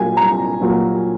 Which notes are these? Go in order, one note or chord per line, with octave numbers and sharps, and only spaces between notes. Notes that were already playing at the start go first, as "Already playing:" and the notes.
Already playing: A#2 F#3 A#3 G#5
C2 A#5
A#2 F#3 A#3